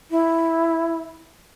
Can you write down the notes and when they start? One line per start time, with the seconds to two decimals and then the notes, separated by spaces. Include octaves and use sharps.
0.11 E4